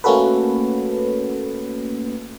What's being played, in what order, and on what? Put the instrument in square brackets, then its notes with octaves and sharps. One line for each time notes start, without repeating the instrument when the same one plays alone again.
[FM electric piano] A3 A#3 C#4 F#4 A4 B4